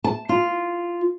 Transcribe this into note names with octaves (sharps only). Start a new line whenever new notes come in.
A5
F4